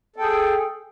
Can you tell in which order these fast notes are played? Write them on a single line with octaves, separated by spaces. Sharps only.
A4 G5 G#4